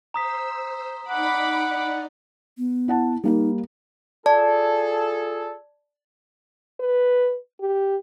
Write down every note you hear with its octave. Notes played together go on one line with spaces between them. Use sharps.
C5 A#5 D#6 E6 B6
D#4 D5 F#5 B5 D6
B3
E4 F#5 A5
G3 A#3 D#4 A#4
F4 G#4 A4 D5 A5
B4
G4